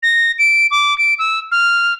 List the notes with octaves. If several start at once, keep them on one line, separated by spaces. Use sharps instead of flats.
A#6
D7
D6
D7
E6
F6